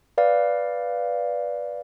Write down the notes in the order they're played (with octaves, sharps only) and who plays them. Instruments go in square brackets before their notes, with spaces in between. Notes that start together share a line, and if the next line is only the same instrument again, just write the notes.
[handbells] B4 D5 F5